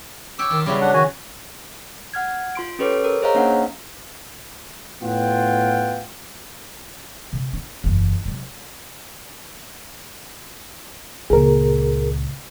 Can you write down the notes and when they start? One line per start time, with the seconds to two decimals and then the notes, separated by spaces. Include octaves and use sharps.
0.39 G4 C#5 G5 D6 E6
0.50 D#3 F4
0.66 C#3 F#3 G3 B3 E4 D6
0.81 D4 F#5
0.94 D#3 F#4 G#5
2.14 F#5 F6 G#6
2.55 F4 C6 D7
2.79 C#4 G4 A4 B4 C#5 D6
3.04 A#4
3.22 G#4 C5 C#5 D#5 F5 A#5
3.35 A#3 C#4 D4 F5 F#5
5.03 A2 B3 F4 F#5 G5
7.33 C3
7.53 D4
7.84 F#1 E2
8.25 C3 F#3
11.30 C#2 A#2 G#4 A#4